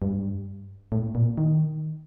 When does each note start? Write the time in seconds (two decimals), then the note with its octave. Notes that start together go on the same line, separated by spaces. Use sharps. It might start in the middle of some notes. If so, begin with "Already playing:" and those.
0.02 G2
0.92 A2
1.15 A#2
1.38 D#3